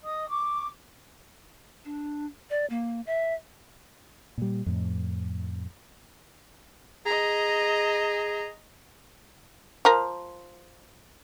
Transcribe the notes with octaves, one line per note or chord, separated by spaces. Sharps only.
D#5 D#6
C#6 D6
D4
D5
A#3
E5
A#2 G3
F2 A2
G#4 D#5 A#5
F3 A#4